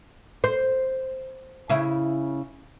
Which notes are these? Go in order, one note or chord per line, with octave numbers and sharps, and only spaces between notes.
C5
C#3 E4